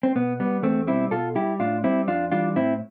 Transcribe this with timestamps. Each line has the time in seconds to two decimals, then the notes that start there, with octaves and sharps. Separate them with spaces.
0.03 C4
0.16 B2 B3
0.40 G3 B3
0.63 E2 A3 C4
0.87 B2 G3 C4 E4
1.11 B2 F4 A4
1.35 G3 E4 G4
1.60 A2 D4 F4
1.84 G3 C4 E4
2.08 F2 D4 F4
2.32 E3 G3 D4 F4
2.56 A2 C4 E4